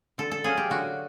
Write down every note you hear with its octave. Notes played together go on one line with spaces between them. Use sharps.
D3 A4
A4
F#3 A#3 C#4 G#4
G4
D3 F#4